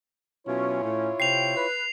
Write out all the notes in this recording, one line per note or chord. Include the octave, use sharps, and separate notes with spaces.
B2 F#3 C#4 E4 F4 C#5
A2 C#4
C3 G5 C7 F7
B4